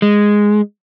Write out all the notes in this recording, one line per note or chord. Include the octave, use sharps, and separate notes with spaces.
G#3